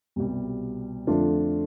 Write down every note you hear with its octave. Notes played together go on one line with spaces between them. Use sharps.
C2 B2 G3
F2 D3 A3 D4 F4